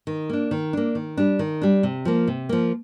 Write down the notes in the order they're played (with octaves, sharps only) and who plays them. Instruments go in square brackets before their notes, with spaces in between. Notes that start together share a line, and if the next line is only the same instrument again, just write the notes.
[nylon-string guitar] D#3
A#3 D4
D#3
A#3 D4
D#3
G3 D4
D#3
G3 D4
C3
F3 A#3
C3
F3 A#3